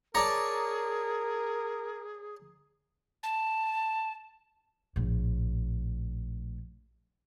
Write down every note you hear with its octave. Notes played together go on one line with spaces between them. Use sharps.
G#4 A#4 C#5 D5 A5 A#5
A5
A#1 A2